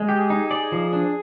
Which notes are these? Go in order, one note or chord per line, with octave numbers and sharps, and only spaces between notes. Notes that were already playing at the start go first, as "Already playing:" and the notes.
Already playing: G#3
G4
G#4
D#4
G#4
D5
F3
D4